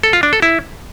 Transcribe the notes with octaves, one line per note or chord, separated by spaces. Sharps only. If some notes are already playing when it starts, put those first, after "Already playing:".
A4
F4
D4
A4
E4